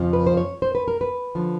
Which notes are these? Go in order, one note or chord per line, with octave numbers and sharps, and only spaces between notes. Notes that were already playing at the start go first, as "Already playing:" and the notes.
Already playing: F2 C#3 F3
B4
C5
C#5
C5
B4
A#4
B4
D3 F3